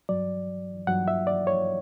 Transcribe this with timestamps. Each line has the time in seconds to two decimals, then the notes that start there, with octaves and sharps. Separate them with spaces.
0.09 G2 F#3 D5
0.87 G2 F#3 F#5
1.08 E5
1.27 D5
1.47 C#5